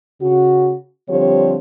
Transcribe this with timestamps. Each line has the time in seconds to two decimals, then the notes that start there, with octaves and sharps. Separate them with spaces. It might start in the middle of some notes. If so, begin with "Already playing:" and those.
0.21 C#3 F#4
1.08 D3 F3 G3 C4 G4 C#5